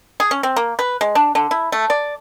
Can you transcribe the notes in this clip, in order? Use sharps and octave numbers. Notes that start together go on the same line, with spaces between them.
G#4
C#4
C4
A#3
B4
G#3
D4
D3
E4
A3
D5